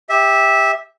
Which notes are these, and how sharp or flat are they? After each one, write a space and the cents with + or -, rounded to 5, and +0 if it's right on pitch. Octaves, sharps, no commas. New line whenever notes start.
G4 +15 E5 -15